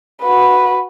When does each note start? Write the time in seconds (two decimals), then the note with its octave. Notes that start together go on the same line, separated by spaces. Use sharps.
0.22 F#4 B4